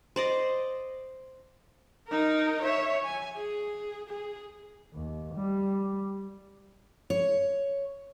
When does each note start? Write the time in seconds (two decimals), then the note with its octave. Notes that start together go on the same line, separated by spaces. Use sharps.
0.16 C5 D5 D#5
2.09 D#4 A#4
2.63 C#5 E5
3.04 G#5
3.37 G#4
4.09 G#4
4.94 D#2
5.35 G3
7.10 C#5